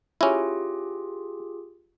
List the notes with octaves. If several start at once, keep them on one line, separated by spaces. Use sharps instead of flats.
C#4 E4 F4 G4 G#4